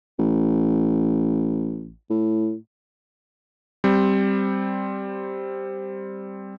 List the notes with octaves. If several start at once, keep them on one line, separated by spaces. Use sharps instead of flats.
A1
A2
G3 C4 C5